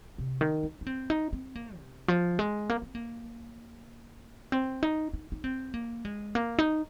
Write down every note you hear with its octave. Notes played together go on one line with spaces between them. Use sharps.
C3
D#3
D#4
D#4
C4
D#4
C4
A#3
C3
F3
G#3
A#3
C4
A#3
C4
D#4
D#4
D#4
C4
A#3
G#3
A#3
D#4